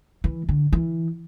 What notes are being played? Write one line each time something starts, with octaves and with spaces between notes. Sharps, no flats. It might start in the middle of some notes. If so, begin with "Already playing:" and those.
E3
D3
E3